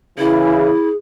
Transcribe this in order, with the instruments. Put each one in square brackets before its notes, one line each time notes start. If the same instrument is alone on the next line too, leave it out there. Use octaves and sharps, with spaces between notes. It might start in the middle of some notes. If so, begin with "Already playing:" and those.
[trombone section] C#3 E3 [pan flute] E4 [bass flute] G#4